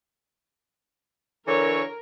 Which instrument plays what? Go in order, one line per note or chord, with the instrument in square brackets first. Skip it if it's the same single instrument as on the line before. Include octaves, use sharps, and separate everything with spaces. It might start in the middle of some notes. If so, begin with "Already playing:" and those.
[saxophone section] D3 E3 C#5 [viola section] A#4